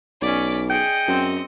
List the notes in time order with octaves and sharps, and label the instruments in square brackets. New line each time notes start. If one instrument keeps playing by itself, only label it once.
[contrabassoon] B1 [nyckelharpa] C#4 D5 [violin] D6 B6
[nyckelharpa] G#4 [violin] D#5 C#7 [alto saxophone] G5
[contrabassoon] F#2 [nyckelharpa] C4